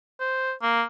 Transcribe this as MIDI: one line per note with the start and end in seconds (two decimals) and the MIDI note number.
0.20 0.52 72
0.62 0.84 58